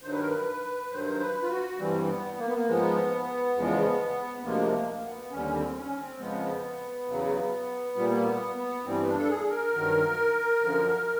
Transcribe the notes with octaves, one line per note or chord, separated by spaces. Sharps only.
G2 D#3 F#3 C5
B4
A#4
B4
G2 D#3 F#3 C5
B4
F4
F#4
G2 E3 G3 C4
C4
B3
A#3
B3
A#3
G#2 F3 G#3 B3
E2 C#3 F3 G#3
B3
D2 C3 F3 G#3 A#3
A#3
A#3
B3
D#2 D3 G3 C#4
C4
C#4
C4
F2 C#3 F3 G#3 B3
E2 C#3 F#3
A#2 G3
A#3
B3
B3
G2 E3 G3 C4
D4
A4
G#4
A#4
G2 D#3 F#3
F#2 D3 F3